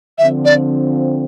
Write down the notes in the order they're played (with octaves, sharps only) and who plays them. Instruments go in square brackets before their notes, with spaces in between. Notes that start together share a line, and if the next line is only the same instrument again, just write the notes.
[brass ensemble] D3 F3 C4 [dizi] E5
[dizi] D5